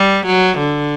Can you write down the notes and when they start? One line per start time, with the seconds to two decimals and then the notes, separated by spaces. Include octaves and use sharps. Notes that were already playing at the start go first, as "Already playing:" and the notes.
Already playing: G3
0.26 F#3
0.58 D3